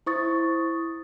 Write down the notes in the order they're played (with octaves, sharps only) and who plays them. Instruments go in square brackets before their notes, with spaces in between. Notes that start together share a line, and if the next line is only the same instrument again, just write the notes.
[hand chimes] E4 C5 C#6 D#6 A6